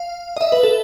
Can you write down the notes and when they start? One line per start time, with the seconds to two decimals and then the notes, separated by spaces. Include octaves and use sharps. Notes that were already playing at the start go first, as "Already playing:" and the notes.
Already playing: F5
0.37 D#5
0.41 E5
0.52 B4
0.63 A4